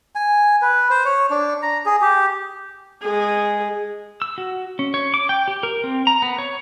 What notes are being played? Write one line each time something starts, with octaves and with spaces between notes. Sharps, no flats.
G#5
B4
C5
C#5
D4
A#5
G#4
G4
G#3 G#4
E6
F#4
C#4
C#5
D6
G5
G4
A#4
C4
A#5
B3
C#5